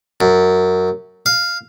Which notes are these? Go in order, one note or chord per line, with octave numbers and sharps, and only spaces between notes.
F#2
F5